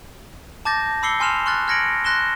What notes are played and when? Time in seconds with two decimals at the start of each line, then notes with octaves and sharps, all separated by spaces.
0.65 A5 D6 G6 A6 A#6
1.03 B5 D6 E6 C7 C#7 G7
1.20 G#5 C6 F6 E7 F7
1.46 C6 C#6 F6 F#6 A6
1.68 F6 G#6 A#6 C#7 D7 F#7
2.04 C6 F#6 A#6 E7 G7